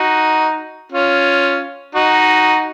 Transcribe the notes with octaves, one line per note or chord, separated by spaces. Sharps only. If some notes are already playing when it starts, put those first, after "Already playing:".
Already playing: D#4 F#4
C#4 F4
D#4 F#4